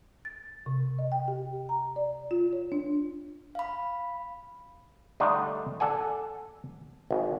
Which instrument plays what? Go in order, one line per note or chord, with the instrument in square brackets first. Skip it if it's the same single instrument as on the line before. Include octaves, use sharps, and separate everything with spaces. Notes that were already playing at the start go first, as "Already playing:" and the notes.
[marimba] A6
C3
D#5
G5
G4
A#5
D5
F4
C#5
D4
[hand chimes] F5 B5
[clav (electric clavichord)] D3 G3 A3 D4 D#4
A4 D5 F#5 G#5
G#1